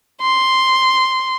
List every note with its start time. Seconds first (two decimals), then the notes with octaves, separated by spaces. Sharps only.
0.21 C6